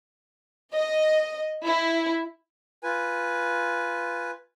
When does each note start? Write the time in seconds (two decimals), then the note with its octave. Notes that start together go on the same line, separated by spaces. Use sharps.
0.75 D#5
1.66 E4
2.82 F4 B4 G#5